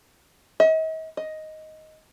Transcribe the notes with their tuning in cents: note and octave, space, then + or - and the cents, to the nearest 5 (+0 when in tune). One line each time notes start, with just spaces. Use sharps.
D#5 +45
D#5 +5